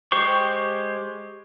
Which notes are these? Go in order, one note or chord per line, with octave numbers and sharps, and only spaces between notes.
G#3 G4 C5 C#6